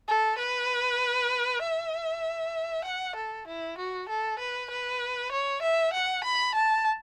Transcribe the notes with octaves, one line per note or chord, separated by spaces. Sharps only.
A4
B4
E5
F#5
A4
E4
F#4
A4
B4
B4
C#5
E5
F#5
B5
A5